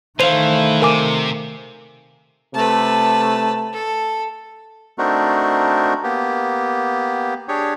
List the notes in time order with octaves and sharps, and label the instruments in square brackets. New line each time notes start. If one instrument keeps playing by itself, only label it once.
[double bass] D#3 A3 [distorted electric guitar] E3 [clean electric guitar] C5 F5 [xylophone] D#7 F7
[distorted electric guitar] C3 [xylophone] A#4 G#5 D6
[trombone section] C3 A3 [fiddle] B4 A5
[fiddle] A4
[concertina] A3 C4 D4 D#4 F#4 A#4
A#3 B3 G4
D4 G4 G#4 C#5